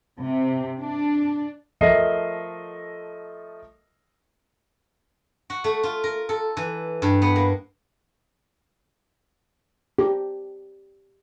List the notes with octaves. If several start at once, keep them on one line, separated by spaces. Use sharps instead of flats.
C3
D4
F3 A3 A#4 D#5 E5 C7
F#4
A3
F4
A#4
A4
E3
G2
B3
A#3
G4